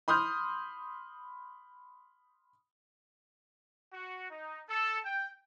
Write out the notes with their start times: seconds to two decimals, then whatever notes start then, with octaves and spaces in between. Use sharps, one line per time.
0.08 B5 C6 D#6 F6 G6
3.93 F#4
4.31 D#4
4.69 A4
5.05 G5